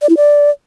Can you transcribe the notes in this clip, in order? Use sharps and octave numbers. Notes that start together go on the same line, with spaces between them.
D5
E4
D5